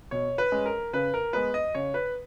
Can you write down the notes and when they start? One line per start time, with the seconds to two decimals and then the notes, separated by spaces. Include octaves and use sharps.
0.11 B2 C#5
0.38 B4
0.52 G#3 C#4
0.66 A#4
0.93 C#3 B4
1.14 A#4
1.33 G#3 B3 B4
1.54 D#5
1.75 C#3 C#5
1.94 B4